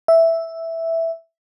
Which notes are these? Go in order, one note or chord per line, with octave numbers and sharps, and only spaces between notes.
E5